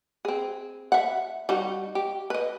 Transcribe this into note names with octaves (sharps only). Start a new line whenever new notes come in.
C4 G#4
E5 F#5
G3 D#4 F#4
G4
B4 D#5